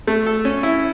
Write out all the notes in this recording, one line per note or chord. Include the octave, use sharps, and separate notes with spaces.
A3
A4
C#4
E4